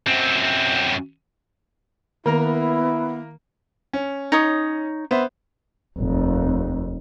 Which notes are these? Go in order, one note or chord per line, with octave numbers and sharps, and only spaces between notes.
F#2 C4
D#3 A#3 B3 E4 A#4 A#5
C#4
D#4 C#5 D#6
B3 C5 E5
F1 D#2